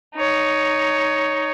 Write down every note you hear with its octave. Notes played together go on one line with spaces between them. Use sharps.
D#4 C#5